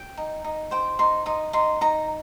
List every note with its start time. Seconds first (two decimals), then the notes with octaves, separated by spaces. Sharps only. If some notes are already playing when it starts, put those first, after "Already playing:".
Already playing: G5
0.17 D#4
0.44 D#4
0.71 C5 G5
0.99 D#4 C6
1.26 D#4 D#6
1.53 D#4 C6
1.81 D#4 A#5